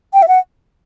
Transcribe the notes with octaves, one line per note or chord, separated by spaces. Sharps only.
G5
E5
F#5